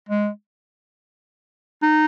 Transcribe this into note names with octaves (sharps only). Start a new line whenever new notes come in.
G#3
D#4